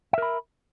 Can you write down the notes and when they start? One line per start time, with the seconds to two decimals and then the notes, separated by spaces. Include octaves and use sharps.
0.13 E5
0.18 A#4
0.22 B5